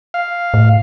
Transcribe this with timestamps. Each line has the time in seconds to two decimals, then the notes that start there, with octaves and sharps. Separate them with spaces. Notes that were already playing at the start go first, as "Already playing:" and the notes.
0.14 F5
0.54 A2